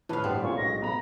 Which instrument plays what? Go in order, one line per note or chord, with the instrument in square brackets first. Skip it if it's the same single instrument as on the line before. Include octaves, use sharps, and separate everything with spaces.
[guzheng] A2 F5 [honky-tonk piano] E3 B4 A5
[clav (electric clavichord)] G2 B3 [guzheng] C4 [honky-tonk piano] G4
[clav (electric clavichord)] A#2 [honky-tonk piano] C#4 E4 G#4 [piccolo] C#6
[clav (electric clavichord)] B1 [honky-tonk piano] G#3 [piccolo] A#6
[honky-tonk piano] B3 B5 [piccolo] A#5